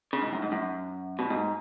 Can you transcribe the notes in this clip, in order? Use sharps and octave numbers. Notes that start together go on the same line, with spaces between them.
C#3
G#2
F#2
G#2
F#2
B2
G#2